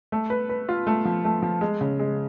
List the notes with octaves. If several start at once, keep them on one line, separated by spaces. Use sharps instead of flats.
A3
B4
B4
F4
A3
F3
A3
F3
G#3
C#3
G#3